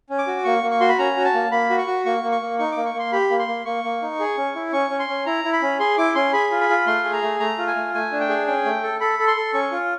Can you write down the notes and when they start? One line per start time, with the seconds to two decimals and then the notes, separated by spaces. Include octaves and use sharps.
0.10 C#4
0.19 D6
0.27 F#4
0.45 A#3 C#6
0.63 A#3
0.71 C#6
0.80 F#4 C6
0.89 B5
0.99 C#4 A#5
1.17 F#4
1.25 A5
1.34 A#3
1.51 A#3 B5
1.70 F#4
1.78 C#6
1.87 F#4
2.06 A#3 C#6
2.23 A#3
2.32 C#6
2.41 A#3
2.59 D#4 C#6
2.72 A#3 D6
2.86 C#6
2.94 A#3 C6
3.12 G4 B5
3.30 A#3
3.39 C6
3.48 A#3
3.65 A#3 C#6
3.84 A#3
4.02 D#4
4.19 G#4
4.37 C#4
4.55 E4
4.72 C#4 C#6
4.90 C#4
4.99 C6
5.08 C#4
5.26 E4 A#5
5.44 E4
5.53 B5
5.62 C#4
5.79 G#4 C6
5.98 E4 D6
6.15 C#4 C6
6.33 G#4 B5
6.51 F4
6.61 B5
6.69 F4
6.86 A3 C6
7.04 G#4
7.13 A#5
7.23 A3
7.40 A3 A#5
7.58 F4
7.67 G#5
7.76 A3
7.94 A3 G#5
8.12 D4
8.21 G5
8.29 G#4
8.47 C#4 G5
8.65 A3
8.83 A4
9.00 A4 B5
9.19 A4
9.27 C6
9.37 A4
9.54 C#4 C#6
9.71 F4